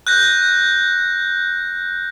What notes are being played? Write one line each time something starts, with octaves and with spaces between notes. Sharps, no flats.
F#6 G6 A#6